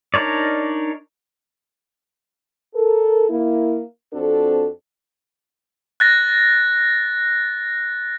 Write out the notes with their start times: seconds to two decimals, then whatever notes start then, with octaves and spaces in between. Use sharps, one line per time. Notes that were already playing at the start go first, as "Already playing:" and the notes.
0.14 D4 D#4 A#4 C#5 D5
2.75 A4 A#4
3.29 A#3 E4
4.12 F2 C4 D4 F#4 A4
6.00 F#6 A6 A#6